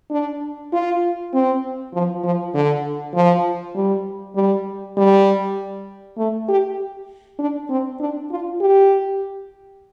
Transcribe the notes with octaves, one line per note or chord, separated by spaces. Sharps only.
D4
F4
C4
F3
F3
D3
F3
G3
G3
G3
A3
G4
D4
C4
D4
F4
G4